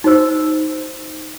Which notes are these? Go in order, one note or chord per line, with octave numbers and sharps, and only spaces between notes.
D#4 F#4 C5 E6